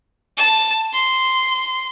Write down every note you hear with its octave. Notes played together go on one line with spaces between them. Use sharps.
A5
C6